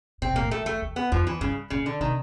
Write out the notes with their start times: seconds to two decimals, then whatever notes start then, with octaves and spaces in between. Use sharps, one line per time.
0.22 A#2 C4
0.33 A#2 A#3
0.42 A2
0.51 A3
0.61 F2
0.66 A3
0.72 F2
0.82 E2
0.96 B3
1.12 F2 F3
1.27 E3
1.40 G2 C#3
1.70 A#2 C#3
1.86 D3
2.00 C3 D#3